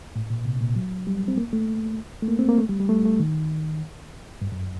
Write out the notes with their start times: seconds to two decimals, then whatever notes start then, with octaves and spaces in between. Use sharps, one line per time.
0.16 A2
0.30 A#2
0.45 C3
0.61 A#2
0.76 F#3
1.07 G3
1.28 C4
1.38 A#3
1.53 A3
2.22 A3
2.28 A#3
2.39 C4
2.49 A#3
2.58 A3
2.69 G3
2.80 G3
2.89 A3
3.05 A3
3.19 D#3
4.42 G2
4.52 F#2